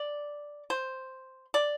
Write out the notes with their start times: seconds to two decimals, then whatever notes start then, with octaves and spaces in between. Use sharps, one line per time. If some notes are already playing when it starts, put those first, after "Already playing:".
Already playing: D5
0.70 C5
1.54 D5